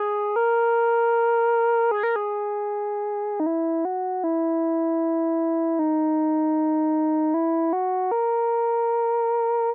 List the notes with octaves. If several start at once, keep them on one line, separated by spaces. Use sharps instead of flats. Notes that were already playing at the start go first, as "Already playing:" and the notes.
Already playing: G#4
A#4
G#4
A#4
G#4
D#4
E4
F#4
E4
D#4
E4
F#4
A#4